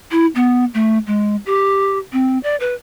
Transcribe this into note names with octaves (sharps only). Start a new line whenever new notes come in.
E4
B3
A3
G#3
G4
C4
D5
B4